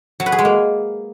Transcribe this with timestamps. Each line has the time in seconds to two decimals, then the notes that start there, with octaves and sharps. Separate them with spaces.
0.20 F#3
0.26 B4
0.32 G#4
0.39 G#3
0.45 A#3